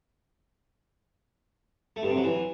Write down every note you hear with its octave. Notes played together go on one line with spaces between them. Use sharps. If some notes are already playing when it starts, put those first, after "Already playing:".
A3
G2
C3
F#3
E3